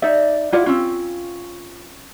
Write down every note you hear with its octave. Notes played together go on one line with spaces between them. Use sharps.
D#4 D5 E5
E4 F4 D5 F#5
C4 C#4 F4